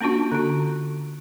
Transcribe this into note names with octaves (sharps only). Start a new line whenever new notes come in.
A#3 C#4 D4 F4 F#4
D3 F#4